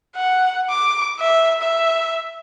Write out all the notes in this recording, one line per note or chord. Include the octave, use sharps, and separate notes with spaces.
F#5
D6
E5
E5